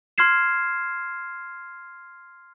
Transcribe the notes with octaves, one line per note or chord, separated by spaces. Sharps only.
C6 F6 G#6 C7 E7